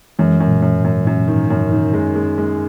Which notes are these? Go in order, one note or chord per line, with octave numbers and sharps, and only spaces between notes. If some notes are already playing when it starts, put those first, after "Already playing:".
F#2 E3 G#3
F#2
A#2
F#2
G#2
F#2
F#2 A#2
D#3
G#2
F#2
G#2
D#3
F#2 G#3
G#3
G#3